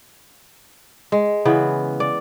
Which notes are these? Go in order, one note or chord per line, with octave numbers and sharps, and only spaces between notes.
G#3
C#3 E3 B3
D5